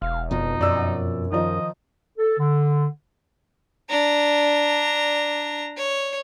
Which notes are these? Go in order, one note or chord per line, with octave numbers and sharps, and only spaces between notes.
E1 F5
F2 B2 F3 D#4
F#2 D5 E6
D#3 F3 D#4 D#5
A4
D3
D4 A#5
C#5